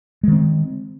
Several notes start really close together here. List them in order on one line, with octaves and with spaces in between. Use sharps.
G#3 D#3 C4